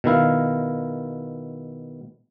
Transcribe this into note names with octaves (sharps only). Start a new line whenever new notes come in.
B2 D#3 E4 F5